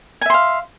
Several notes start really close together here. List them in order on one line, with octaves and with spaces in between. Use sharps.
G#5 E5 C6 F5